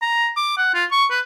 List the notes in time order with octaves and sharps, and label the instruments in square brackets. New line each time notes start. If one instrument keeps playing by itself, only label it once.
[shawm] A#5
D6
F#5
F4
C#6
B4